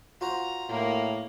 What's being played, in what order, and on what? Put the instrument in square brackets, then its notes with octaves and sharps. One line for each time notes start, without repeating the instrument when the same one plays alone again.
[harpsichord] F4 F#4 C5 [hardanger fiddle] A#5
[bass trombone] A2 [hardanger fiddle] A#3 A#4